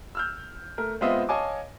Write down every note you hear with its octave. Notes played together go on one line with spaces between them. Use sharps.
E6 F6 G6
A3 A#4
G#3 B3 C4 F4 D#5 E5
C#5 D#5 F5 G#5 A5 D6